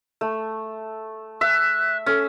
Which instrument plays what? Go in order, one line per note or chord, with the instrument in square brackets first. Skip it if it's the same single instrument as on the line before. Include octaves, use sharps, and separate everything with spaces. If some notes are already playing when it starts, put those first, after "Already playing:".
[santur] A3
[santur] E5 [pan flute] F#6
[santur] C#4 [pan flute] A4